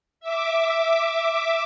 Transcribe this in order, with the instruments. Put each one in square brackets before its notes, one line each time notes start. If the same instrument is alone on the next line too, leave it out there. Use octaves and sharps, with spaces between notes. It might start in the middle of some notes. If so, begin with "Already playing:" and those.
[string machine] E5 D6